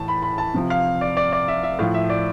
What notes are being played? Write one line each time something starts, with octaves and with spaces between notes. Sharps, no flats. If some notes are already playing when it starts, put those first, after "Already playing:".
Already playing: A2 E3 A5
B5
B5
A5
C3 F3
F5
D5
D5
D5
E5
E5
A2 F3 F5
E5
D5